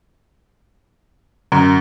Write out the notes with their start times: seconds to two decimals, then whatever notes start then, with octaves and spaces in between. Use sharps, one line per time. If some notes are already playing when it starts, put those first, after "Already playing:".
1.52 F#2 D3